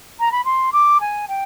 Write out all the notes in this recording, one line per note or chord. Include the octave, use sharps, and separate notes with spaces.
A#5
B5
C6
D6
G#5
G5